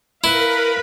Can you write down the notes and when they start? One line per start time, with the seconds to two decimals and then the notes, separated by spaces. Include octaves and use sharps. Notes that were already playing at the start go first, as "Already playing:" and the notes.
0.24 E4 A#4 B4 F5 B5